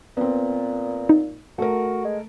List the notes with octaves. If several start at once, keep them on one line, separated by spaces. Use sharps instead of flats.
A#2 B3 C4
D#4
A3 F#4 A#4
G#3